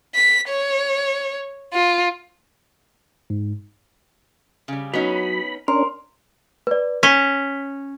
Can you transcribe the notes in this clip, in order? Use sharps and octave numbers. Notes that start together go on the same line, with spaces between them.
B6
C#5
F4
G#2
C#3 G3
F#3 B3 C#4 D#4 B5
C#4 D4 A#4 C6
B4 D5
C#4 B6 G7